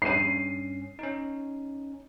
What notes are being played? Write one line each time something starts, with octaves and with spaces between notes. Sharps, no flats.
G2 C#4 C7 D#7
C#4 D#4